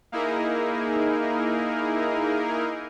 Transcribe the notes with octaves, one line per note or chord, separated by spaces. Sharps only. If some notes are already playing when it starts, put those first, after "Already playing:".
A#3 D#4 E4 G#4 A#4